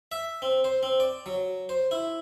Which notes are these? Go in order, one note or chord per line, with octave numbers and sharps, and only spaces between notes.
E5
C4
C5
C4
D5
F#3
C5
E4